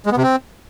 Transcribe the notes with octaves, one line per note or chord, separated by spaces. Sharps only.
G#3
B3
C3
C4